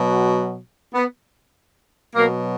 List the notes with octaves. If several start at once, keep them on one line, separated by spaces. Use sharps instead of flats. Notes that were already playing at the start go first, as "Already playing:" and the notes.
Already playing: B2 F#3
B3
B2 F#3 A#3